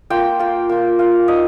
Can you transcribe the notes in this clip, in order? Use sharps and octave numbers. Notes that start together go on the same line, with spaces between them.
A#3 F4 G5
A#3 F4
A#3 F4
A#3 F4 F5
A#3 D#4 D#5